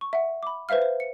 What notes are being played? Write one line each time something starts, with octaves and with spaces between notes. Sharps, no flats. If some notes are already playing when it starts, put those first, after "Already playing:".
C#6
E5 F#5
B5 D6
B4 C5 E5 F5 F6
C5
C#7